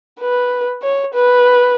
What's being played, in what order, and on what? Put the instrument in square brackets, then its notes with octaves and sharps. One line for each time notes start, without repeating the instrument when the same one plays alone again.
[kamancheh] B4
C#5
B4